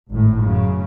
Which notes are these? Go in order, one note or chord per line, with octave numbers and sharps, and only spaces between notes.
G#1 A2
F#2 C#3